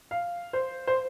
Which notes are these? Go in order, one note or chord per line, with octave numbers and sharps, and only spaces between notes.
F5
C5
C5